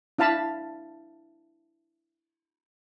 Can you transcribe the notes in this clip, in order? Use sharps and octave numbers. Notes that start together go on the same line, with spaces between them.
D4 E4 F5 A5 B5